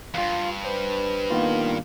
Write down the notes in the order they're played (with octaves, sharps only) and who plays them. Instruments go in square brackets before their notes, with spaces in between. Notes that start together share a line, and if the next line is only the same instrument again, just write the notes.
[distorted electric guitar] E2 G2 [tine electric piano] F4 F5
[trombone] B4 [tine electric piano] C5
[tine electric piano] D#3 B3 F4 [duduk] A#3